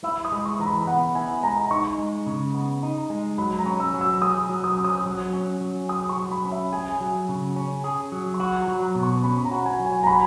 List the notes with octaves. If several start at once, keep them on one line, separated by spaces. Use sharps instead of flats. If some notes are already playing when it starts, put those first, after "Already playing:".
E4 E6
D#6
G#3
C#6
E3 A#5
B5
B3 F#5
E4 G#5
G#3 A#5
D#4 C#6
G#3
C#3
B3
D#4
G#3
F#3 B5
A#5
C#4
E6
F#3
E6
G#4 D#6
F#3
D#6
C#4
D#6
F#3
C#4
F#3
G#4 D#6
C#6
F#3
B5
C#4
E5
G#4 G#5
F#3
C#3
C#4
G#4
F#3
C#6
F#4 B5
A#5
F#3
A#5
B2
C#6
C#4 B5
A#5
F#4
G#5
F#3
G#5
A#5
F#4 B5